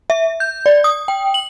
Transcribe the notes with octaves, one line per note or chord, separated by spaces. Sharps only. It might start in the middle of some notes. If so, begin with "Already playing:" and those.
E5
G6
D5
D#6
G5
F#7